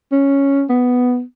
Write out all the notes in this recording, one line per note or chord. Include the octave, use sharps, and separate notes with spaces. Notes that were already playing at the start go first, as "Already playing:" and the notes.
C#4
B3